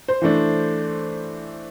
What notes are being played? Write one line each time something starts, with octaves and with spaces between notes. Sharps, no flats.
C5
E3 A3 D4